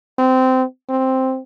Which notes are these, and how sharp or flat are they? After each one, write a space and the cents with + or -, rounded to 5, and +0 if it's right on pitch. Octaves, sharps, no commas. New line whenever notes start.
C4 -20
C4 +5